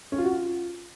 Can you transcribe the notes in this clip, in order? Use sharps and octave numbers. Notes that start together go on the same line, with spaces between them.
C#4
F4
F#4
F4